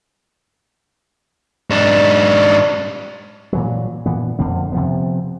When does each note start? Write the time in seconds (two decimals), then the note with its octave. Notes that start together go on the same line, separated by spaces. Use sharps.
1.70 G#2 D4
3.53 A#2 E3 F#3
4.06 A#2 E3 B3
4.39 F2 D3 A#3 C4
4.72 C3 F3 B3